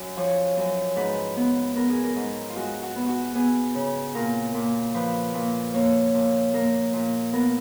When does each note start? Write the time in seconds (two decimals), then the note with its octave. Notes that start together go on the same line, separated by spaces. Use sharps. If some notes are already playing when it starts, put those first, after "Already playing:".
Already playing: F#2
0.17 F3 C#5
0.57 F#2
0.96 G#2 B4
1.36 B3
1.75 B3 A#4
1.90 G#4
2.03 A#4
2.16 G#2
2.50 F4
2.56 G#3 F#4
2.82 F#4
2.95 B3
3.08 F#4
3.35 B3 G#4
3.75 C#3
4.15 A#2 A#4
4.54 A#2
4.94 F3 B4
5.34 A#2
5.74 A#3 C#5
6.14 A#2
6.53 A#3 A#4
6.93 A#2
7.33 B3 A#4